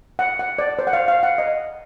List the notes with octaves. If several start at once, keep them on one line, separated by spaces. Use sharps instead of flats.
F#5
F#5
D5
C5
F#5
F5
F5
F#5
D#5